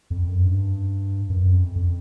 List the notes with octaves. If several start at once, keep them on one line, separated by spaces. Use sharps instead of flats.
F2
F#2
G2
F#2
F2
F2